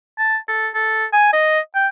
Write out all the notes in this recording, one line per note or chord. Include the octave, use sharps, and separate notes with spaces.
A5
A4
A4
G#5
D#5
G5